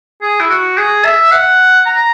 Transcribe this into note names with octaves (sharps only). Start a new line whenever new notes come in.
G#4
E4
F#4
G#4
E5
F#5
A#5